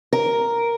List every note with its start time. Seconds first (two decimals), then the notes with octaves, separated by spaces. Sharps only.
0.13 A#4